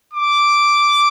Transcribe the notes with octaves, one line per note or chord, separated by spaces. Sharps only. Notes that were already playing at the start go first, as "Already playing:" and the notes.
D6